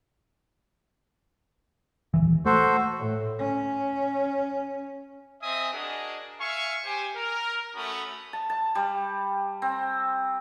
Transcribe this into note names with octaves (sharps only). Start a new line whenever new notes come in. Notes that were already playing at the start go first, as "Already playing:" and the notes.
D#1 C#2 E3
A3 F#4 A4 C5
A2
C#4
C4 D#5 E5 G#5 D#6
D4 F#4 G#4 A#4 D#5
E5 F5 G#5 C#6
G4 C5 G#5
A#4
A3 C#4 F#4 B5 D#6
A5
A5
G3
C4